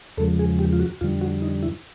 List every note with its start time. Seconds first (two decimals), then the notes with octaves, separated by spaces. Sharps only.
0.17 E2 C#3 F3 G#3 A4
0.39 G#4
0.59 G4
0.73 F4
0.80 F#4
1.01 F2 D3 G3 F4
1.21 F#4
1.42 D#4
1.63 E4